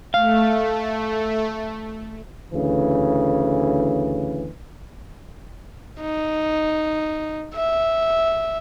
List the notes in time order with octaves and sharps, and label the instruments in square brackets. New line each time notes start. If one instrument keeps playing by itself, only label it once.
[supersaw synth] A3 [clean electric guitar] F5
[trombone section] D2 C#3 E3
[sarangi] D#4
E5